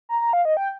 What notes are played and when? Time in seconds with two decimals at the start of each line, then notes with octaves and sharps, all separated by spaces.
0.09 A#5
0.21 A#5
0.33 F5
0.45 D#5
0.57 G5